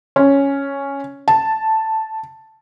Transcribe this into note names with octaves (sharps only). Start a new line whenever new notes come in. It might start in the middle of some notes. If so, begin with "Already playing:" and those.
C#4
A5